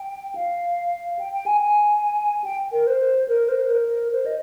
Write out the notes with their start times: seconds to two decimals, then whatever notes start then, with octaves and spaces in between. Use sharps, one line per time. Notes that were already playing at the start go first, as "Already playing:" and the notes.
Already playing: G5
0.35 F5
1.19 G5
1.33 G5
1.46 G#5
1.61 G#5
2.44 G5
2.72 A#4
2.87 C5
3.29 A#4
3.49 C5
3.70 A#4
4.12 C5
4.26 D#5